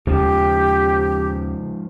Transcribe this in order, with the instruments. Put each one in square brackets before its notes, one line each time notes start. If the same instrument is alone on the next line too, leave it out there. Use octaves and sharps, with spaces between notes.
[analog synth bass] D#2 [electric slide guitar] G#2 F3 [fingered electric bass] C#3 [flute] G4